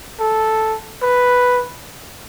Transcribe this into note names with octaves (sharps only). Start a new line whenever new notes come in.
A4
B4